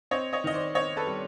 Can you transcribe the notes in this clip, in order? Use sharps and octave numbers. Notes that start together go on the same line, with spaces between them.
C4 C#5 D#5
C#5 D#5
D#3 D#5
C5 D5
C4 C#5 D#5
A4 B4
G3